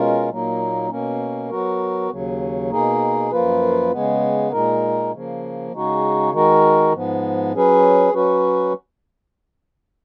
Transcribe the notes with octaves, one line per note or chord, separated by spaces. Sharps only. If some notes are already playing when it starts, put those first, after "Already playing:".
Already playing: B2 G#3 C#4 F4 A#4
A#2 F#3 A#3 D#4
B2 A#3 C#4
F#3 B3 F#4 A#4
D#2 C#3 F#3
B2 A#3 D#4 G#4
F#2 F3 A#3 F4 B4
C#3 G#3 B3
A#2 G#3 D#4 A#4
C#3 F3 A#3
C#3 G#3 D#4 F#4
D#3 G#3 D#4 F#4 A#4
G#2 F3 B3
F#3 C#4 G#4 B4
F#3 C#4 F#4 B4